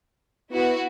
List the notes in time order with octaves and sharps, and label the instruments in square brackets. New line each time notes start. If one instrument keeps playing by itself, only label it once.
[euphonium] B3 [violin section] E4 F#4